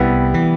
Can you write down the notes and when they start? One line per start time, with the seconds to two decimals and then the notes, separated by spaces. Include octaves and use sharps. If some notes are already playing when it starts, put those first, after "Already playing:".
Already playing: C2 C3 G3 B3 E4
0.34 E3